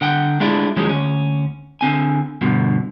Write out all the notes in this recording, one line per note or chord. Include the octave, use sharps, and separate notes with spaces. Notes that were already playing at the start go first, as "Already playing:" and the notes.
D3 F#5 G5
G#3 A3 D4 E4 F4
D#2 F3 F#3 G#3 C#4
D2 C#4
D3 C4 G#5
G2 B2 D3 F3